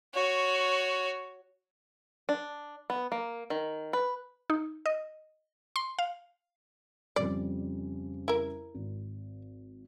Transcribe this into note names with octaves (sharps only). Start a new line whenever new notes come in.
F#4 C#5
D4
B3
A#3
D#3
B4
D#4
D#5
C6
F5
F2 C#3 G3 D5
E4 A#4
G#1